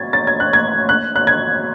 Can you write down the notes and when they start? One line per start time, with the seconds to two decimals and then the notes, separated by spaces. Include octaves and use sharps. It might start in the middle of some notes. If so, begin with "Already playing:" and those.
Already playing: G#6 A6
0.13 A6
0.27 G#6
0.40 F#6
0.53 G#6
0.89 F#6
1.16 F#6
1.27 G#6